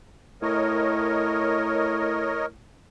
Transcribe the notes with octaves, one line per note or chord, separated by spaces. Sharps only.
A2 A#4 C#5 D#5